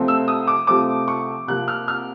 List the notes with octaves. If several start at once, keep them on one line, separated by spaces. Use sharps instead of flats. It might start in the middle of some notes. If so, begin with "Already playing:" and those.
Already playing: C2 C3 F3 A3 C4
E6
D#6
D6
C2 C3 F3 A3 C4 D6
C#6
C2 C3 F3 A#3 F#6
F6
F6